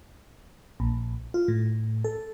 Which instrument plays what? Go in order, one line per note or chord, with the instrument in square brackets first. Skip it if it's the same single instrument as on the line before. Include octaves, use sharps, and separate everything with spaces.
[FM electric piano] A#1
F4
A2
A4